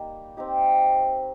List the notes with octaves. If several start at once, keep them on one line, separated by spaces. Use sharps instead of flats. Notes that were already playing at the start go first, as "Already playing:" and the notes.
Already playing: G3 A#3 D#4
C4 D#4 G4